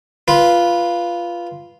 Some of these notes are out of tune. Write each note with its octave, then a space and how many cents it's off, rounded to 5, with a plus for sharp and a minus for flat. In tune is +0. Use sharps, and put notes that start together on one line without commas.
F4 -10 B4 -15